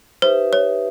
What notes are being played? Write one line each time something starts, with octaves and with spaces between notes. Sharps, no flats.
D#4 G4 B4 C5 E5
C#5